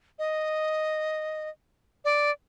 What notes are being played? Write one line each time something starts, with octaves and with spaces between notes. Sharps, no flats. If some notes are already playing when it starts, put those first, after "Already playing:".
D#5
D5